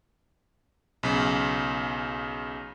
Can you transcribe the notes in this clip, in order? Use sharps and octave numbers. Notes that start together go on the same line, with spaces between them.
B1 C#3